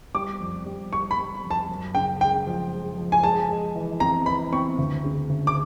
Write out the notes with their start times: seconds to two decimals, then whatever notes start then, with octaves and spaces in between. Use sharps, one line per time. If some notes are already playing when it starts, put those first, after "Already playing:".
0.15 G3 D6
0.40 F2
0.66 G3
0.92 G3 C#6
1.11 B5
1.17 G3
1.44 F2
1.51 A5
1.69 F#2
1.95 C#3 G5
2.21 G#3 G5
2.47 F3
2.73 G#3
2.98 F3
3.12 G#5
3.23 G#3 A5
3.49 G#3
3.76 E3
4.00 C4 A#5
4.26 E3 B5
4.52 C4 C#6
4.78 D2
5.04 C#3
5.30 D2
5.47 D6